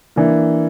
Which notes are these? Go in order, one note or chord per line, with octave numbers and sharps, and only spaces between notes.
E3 A#3 D4